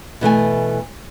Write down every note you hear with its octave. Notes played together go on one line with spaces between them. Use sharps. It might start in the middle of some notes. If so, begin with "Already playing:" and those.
B2 E3 A3 G#5